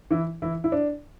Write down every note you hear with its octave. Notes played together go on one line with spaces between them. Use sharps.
E3 E4
E3 E4
E4
D4